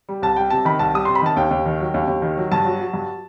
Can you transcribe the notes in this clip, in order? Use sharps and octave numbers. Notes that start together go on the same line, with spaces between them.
G3
C2 A5
G3 G5
C3 A5
D#3 B5
C2 A5
G3 D#6
C3 C6
B5
D#3 A5
D#2 G5
D#2
D#3
F#3
D#2
D#2
D#3
F#3
G2 A5
F#3
F#3
G2